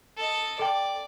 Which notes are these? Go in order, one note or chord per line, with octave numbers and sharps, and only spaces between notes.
A4 D#5
A4 D5 G5